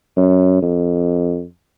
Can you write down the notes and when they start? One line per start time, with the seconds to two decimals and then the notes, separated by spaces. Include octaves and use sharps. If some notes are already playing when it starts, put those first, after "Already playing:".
0.17 F#2
0.62 F2